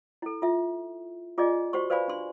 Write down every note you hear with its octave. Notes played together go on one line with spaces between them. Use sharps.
E4 A4
F4 E5
F4 G#4 D5 D#5 G#5
F#4 G4 C5 C6 C#6
B4 C5 D5 F5 G#5 B5
D4 C6